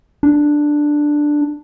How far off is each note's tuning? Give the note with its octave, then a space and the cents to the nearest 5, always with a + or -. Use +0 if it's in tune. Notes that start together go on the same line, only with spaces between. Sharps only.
D4 +5